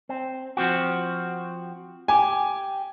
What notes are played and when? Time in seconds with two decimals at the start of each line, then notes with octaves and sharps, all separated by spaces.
0.09 C4
0.57 F3 C4 F#4
2.08 G4 G#5